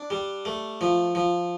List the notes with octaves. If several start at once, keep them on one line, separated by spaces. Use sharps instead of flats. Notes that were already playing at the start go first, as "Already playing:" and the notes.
Already playing: D4
G3
A3
F3
F3